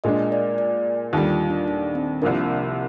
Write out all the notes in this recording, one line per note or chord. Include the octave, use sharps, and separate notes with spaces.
A#2 G#3 D4 D#5
D5
D5
D#2 D3 G3 F4
F4
D4
D4
C4
C2 C3 F3 A#3 D4